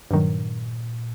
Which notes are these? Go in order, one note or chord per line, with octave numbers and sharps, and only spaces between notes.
G2 A#2 D#3 F#3